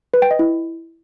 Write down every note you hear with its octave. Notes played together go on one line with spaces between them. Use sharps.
B4
G5
D#5
E4